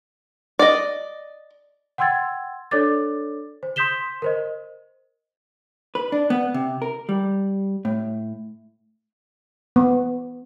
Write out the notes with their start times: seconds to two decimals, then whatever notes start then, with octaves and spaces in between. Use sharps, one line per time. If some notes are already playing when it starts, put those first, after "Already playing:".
0.59 D5 D#5
1.98 F#5 G5 C6 E6 G#6 A6
2.71 D4 A4 C#5 D5 D6 A6
3.63 C5
3.76 C6 D#6 G6 B6 E7 G7
4.22 A#4 C5 D#5
5.95 B4
6.12 D4
6.30 B3
6.54 C3
6.82 A#4
7.09 G3
7.85 A2
9.76 B3